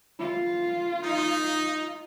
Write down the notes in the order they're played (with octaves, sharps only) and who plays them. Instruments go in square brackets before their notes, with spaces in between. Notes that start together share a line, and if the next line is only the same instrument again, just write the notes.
[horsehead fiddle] F4
[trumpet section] D#4